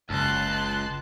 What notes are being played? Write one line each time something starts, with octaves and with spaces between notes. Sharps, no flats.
F#1 C#2 C#3 A5 C6 F#6